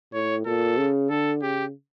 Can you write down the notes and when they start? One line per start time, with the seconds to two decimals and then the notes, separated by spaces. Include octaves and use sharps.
0.13 A2 C#5
0.46 A#2 A4
0.77 C#3
1.10 D3 A4
1.42 C#3 G4